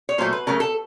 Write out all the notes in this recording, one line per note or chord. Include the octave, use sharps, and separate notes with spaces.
C#5
A#2 F#3 A3 C5
B4
C#3 F#3 A3 A#4
A4